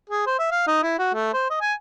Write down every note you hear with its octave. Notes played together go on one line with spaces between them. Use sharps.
G#4
C5
E5
F5
D#4
E4
F#4
A3
C5
D#5
G#5